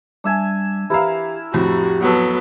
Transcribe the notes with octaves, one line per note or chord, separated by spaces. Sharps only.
G3 D4 E5 G#5
E3 E4 G4 A#4 E5 F5
F2 A2 F#4 G4
F#3 B3 A4 F#5